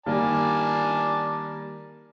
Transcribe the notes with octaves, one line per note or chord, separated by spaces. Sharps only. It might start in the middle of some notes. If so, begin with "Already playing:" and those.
D#3 G3 A#3 D5 G#5 A5